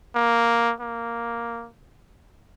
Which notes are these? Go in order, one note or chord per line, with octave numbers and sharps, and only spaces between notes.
A#3
A#3